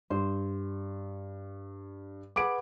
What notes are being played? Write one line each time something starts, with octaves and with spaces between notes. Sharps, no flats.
G2 C5
G#4 B4 F#5 D6 D7